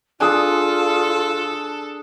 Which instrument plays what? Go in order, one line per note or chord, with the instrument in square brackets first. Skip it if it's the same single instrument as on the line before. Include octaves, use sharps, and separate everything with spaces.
[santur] D4 G#4 D#6 [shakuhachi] F4 [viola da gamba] A4